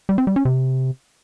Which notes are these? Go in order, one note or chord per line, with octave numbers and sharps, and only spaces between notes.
G3
C4
G3
C#4
C3